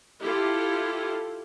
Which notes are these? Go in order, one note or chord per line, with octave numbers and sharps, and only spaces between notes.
E4 F4 G4 A4